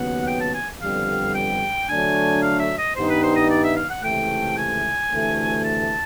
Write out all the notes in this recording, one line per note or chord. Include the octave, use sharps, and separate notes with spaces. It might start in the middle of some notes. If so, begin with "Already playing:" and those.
Already playing: D#2 C#3 F#3 B3 F#5
G5
A5
G#5
F2 D3 G3 B3 F5
G5
D3 F#3 A3 D4 G#5
F5
E5
D#5
G2 D#3 G3 B3 D#4 C5
B4
C5
D#5
D5
E5
F5
F#5
C#2 C3 E3 A3 G5
G#5
D2 C3 E3 A3
A5